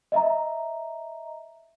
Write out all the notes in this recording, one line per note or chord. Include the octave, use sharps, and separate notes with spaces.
D#5 E5 A#5